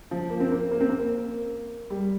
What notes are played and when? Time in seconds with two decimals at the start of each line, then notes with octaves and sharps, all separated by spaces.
0.11 F3
0.30 A#3
0.40 C4
0.52 A#3
0.71 A#3
0.81 C4
0.90 A#3
1.90 G3